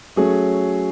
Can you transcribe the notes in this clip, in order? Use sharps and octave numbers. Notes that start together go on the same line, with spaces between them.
F#3 A3 C#4 G#4